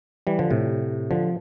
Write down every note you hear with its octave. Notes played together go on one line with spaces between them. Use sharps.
E3 G3
D3 F3
A2 C3
D3 F3